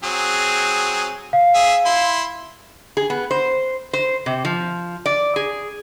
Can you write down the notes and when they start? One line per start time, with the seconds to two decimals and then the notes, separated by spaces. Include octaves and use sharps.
0.04 F#3 C4 G#4
1.33 F5
1.54 G#4 E5
1.85 E4 C6
2.97 G#4
3.10 B3
3.31 C5
3.93 C5
4.26 C3
4.45 F3
5.06 D5
5.36 G#4